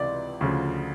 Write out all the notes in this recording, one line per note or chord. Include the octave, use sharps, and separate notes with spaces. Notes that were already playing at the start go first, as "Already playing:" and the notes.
Already playing: C#2 C3 E3 D5
D2 C#3 F3